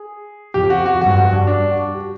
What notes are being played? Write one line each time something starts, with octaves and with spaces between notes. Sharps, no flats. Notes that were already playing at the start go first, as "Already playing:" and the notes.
Already playing: G#4
F2 G4
F#4
F#4
G2 F#4
F#4
D4
D4
F#4
G4